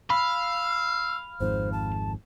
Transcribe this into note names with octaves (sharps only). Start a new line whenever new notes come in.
F5 B5 E6
G#1 F2 G#2 C5
A5